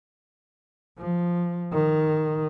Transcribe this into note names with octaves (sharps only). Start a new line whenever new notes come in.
F3
D#3